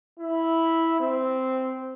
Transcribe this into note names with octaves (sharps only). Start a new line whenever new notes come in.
E4
C4